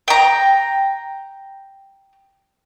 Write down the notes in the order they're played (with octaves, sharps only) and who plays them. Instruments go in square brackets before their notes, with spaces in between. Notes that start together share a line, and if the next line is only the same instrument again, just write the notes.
[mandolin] G5 A#5